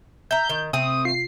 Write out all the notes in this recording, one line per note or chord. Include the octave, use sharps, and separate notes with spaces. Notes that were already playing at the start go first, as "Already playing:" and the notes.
E5 A#5 G6
D#3
C3 A3 C4 D#6
F4 C7